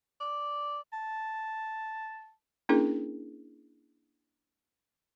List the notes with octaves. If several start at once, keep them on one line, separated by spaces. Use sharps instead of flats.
D5
A5
A#3 C#4 D4 E4 G#4 A#4